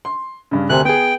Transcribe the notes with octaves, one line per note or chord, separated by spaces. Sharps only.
C6
G2 C#3
D2 C3 A#4 G#5 F#6
B3 G#4 G5